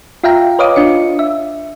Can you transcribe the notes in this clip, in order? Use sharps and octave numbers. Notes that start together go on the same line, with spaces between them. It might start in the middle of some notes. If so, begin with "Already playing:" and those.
F4 E5 F5 G5 A#5
B4 C#5 D#5 F5 D6 D#6
D4 F4 C#7
E5